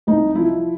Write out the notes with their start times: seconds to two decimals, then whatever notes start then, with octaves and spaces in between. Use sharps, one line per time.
0.07 C2 D#4
0.35 F3 E4